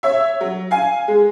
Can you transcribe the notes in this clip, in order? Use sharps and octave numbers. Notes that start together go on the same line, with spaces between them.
C#5 E5
F#3
F5 G#5
G#3